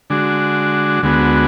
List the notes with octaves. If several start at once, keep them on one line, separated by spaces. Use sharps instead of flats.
D3 G#3 D4 F#4
D2 D3 G#3 B3 F#4